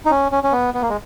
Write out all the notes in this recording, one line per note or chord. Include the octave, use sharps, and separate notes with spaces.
D#4
C#4
C#4
C#4
B3
B3
A#3
G#3